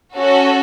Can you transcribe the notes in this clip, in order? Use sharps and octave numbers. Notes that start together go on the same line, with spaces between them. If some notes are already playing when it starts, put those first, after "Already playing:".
C#4 F#4 A4